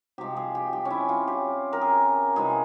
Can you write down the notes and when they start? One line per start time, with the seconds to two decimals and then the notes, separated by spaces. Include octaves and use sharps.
0.18 C3 F3 G#3 G4
0.36 G#4
0.55 G4
0.73 G4
0.85 C#4
0.90 E4
1.09 F4
1.27 G4
1.73 A#4
1.81 G#4
2.36 C3 E3 G#3 G#4